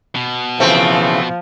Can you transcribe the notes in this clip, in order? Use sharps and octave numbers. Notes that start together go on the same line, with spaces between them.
B2
C#3 E3 F3 A3 C4